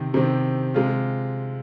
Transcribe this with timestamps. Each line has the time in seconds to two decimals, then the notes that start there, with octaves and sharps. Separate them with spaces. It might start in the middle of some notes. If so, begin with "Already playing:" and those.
Already playing: C3 D#3 C4
0.14 C3 D#3 C4
0.74 C3 G#3 F4